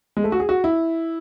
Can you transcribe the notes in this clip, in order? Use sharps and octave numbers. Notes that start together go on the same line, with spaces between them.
G#3
A3
F#4
G#4
F#4
E4